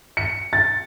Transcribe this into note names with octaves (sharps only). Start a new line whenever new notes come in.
C#7
A6